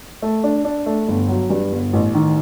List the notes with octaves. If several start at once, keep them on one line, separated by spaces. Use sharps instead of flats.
A3
D4
D4
A3
G1
F#3
G2
G1
A1
D#3